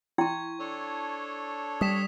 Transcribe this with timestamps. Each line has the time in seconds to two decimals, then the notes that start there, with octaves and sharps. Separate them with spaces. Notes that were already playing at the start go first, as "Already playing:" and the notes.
0.18 E4 G5 C6 C#6 G#6
0.60 D4 A4 C#5
1.81 G3 D#6 B6 E7